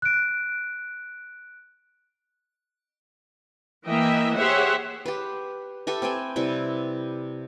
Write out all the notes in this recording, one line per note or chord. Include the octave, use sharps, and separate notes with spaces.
F#6 D7
E3 A#3 D#5 E5 G5
G4 G#4 C5 C#5 E5 F#5
G4 B4
G4 A4 B4 E5
C4 B4 G5 G#5
C3 G3 E4 B4